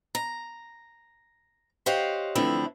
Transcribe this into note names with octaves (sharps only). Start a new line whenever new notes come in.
A#5
G4 C5 C#5 D#5 F5 F#5
D3 E3 F3 A3 C4 E4